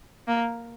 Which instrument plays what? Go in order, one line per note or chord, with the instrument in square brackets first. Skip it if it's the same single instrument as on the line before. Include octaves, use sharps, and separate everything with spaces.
[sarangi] A#3